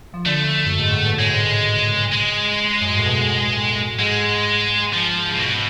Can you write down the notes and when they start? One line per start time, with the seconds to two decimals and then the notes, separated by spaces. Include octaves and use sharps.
0.14 F3
0.25 D3 A3
0.66 F#2
0.79 G#2
0.92 A2
1.06 B2
1.19 C#3 G#3
2.12 G#3
2.81 F#2
2.90 G#2
2.98 A2
3.06 B2
3.52 A2
3.99 G#2 G#3
4.93 F3
5.32 C#3
5.40 B2